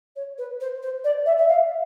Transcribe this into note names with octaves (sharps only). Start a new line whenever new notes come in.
C#5
B4
C5
C5
D5
E5
E5
F5